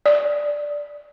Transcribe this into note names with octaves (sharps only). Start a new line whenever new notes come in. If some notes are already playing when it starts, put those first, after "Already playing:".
D5